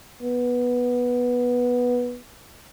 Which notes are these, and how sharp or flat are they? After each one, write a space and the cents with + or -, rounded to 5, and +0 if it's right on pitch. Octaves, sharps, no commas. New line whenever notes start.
B3 -10